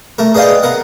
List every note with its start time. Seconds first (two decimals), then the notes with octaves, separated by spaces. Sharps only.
0.18 A3 A#4
0.34 G#4 B4 D5 D#5 F5 G5
0.63 B3 A#4 F#5